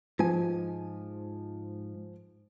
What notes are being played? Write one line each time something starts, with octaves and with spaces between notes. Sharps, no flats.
G#2 F3 G#3 G#5